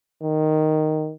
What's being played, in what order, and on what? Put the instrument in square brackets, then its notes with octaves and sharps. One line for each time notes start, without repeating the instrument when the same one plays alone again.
[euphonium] D#3